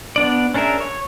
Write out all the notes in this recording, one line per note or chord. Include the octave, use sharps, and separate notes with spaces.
B3 D4 D5
C#4 D4 G#4 A#4 E5
C#5